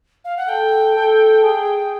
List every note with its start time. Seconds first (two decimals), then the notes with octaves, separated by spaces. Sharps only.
0.25 F5
0.37 F#5
0.49 A4 G5
0.96 A4
1.43 G#4